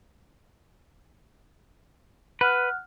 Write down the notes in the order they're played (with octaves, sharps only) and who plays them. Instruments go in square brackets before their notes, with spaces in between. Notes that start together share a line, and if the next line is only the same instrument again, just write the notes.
[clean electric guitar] B4 [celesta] F#5 F6 F#6